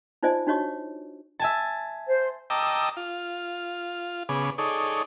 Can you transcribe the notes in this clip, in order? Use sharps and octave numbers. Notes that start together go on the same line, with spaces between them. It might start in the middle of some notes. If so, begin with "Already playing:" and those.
D#4 F4 C5 D5 D#5 G#5
D4 D#4 F#4 C#5 D#5 C#6
E5 G#5 A5
C5
D#5 G5 A5 A#5 D6 E6
F4
C#3 B3 G#4 D6
D#4 G#4 A4 C#5 D5